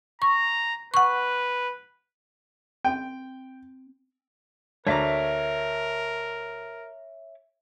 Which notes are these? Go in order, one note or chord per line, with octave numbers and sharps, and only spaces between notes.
A#5 C#6
B4 F#5 C#6
C4 G5
D2 A#4 C#5 E5 A#5 D6